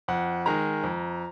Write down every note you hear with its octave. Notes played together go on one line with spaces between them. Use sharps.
F2 F#5
D#3 G#3 A#5
F2